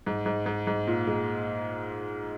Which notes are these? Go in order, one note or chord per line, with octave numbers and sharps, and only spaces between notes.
G#2
G#2
G#2
G#2
A#2
G#3